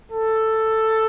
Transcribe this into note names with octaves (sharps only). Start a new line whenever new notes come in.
A4